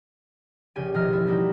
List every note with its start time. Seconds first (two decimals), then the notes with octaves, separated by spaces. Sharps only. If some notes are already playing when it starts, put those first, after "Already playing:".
0.76 A#1 C#3 G4 G#5 D#7
0.94 E1 A1 D#3 F3 D#5 F6
1.09 A3 E4
1.27 G3 A#3 D#4 E4 F#4 G4